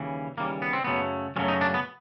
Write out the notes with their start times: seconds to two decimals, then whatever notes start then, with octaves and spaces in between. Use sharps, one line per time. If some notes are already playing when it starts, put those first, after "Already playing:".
Already playing: D#2 C#3 E3 G3
0.37 D#2 C#3 E3 G3 A#3
0.62 B3
0.73 C4
0.84 F#2 C#3 F#3 A3 B3
1.36 F#2 C#3 F#3 A3 C#4
1.48 D#4
1.61 D4
1.74 B3